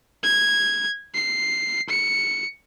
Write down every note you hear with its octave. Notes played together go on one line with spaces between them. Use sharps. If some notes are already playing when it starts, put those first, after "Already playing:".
G#6
C7
C#7